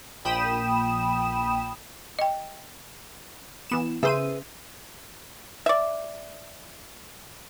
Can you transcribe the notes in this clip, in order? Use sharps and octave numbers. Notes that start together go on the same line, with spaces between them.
A#1 A#2 G5 B5 D#6 E7
D#5 G5
E3 B3 E7
C#3 G#4 B4 C5 E5 D#7
D5 E5